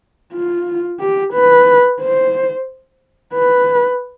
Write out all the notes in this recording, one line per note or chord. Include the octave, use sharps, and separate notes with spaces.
F4
G4
B4
C5
B4